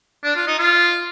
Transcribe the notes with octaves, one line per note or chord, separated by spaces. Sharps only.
D4
F4
D#4
F4